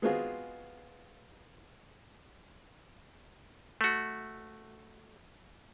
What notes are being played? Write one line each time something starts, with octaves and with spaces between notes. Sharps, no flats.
G#3 B3 C4 F4 F#4 G#4
A3 F#4